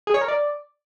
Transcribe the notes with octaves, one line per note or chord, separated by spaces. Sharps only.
G#4
C#5
A#4
D5